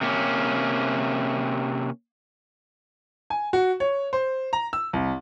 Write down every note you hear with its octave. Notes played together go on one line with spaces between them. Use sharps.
C3 A#3 C#4
G#5
F#4
C#5
C5
A#5
E6
C2